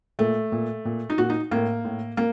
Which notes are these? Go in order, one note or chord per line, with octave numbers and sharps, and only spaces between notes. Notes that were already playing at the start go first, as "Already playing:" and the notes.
A#2 A3
A#2
A#2
D#4
A#2 F#4
D#4
A2 A#3
A2
A#3